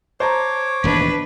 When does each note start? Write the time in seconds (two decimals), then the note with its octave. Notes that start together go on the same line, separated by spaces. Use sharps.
0.20 C5 C#5 A5 A#5 D6
0.84 E1 D#2 A2 D4 B4